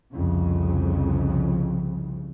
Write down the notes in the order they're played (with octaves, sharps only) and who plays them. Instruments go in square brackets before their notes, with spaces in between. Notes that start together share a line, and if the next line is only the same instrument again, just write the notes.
[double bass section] C2 F2 C#3